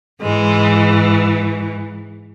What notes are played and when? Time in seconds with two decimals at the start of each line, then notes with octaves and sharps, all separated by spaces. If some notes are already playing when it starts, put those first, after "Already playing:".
0.20 G#2 E3 G#3